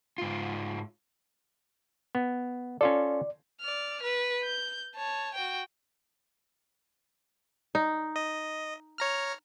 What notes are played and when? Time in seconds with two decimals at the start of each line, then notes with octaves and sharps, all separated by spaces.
0.18 G#2 F4
2.15 B3
2.81 C#4 F4 A4 D5
3.61 D5 F6
4.03 B4
4.44 G6
4.96 C#5 A5
5.34 F#4 G5
7.75 D#4
8.16 D#5
8.98 C#5 A#5 F6